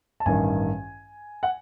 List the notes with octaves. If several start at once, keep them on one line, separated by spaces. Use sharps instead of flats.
A5
A1 G2 D#3 G#5
F#5